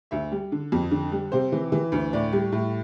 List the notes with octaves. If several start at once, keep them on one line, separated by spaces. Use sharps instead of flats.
D2 E5
G3
D3
F2
D3
G3
C3 C5
E3
E3
D2
A2 D5
G3
A2